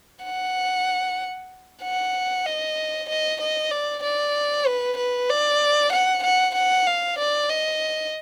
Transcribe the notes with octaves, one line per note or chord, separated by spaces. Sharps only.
F#5
F#5
D#5
D#5
D#5
D5
D5
B4
B4
D5
F#5
F#5
F#5
F5
D5
D#5